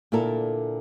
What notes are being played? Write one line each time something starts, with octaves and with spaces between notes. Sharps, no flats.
A#2 D3 E4 A4 A#4